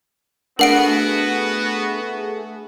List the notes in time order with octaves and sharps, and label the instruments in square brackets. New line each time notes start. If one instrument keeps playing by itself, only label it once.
[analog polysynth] A3 G#4 [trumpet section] B3 F#4 [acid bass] D4 [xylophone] A#4 F#5 D7